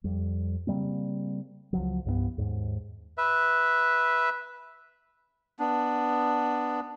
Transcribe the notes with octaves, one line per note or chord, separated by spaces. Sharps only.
F2 G3
C#3 G3 A#3 C4
C#2 F3 F#3
C2 G2 G#3 B3
D#2 G#2
B4 E5
B3 D4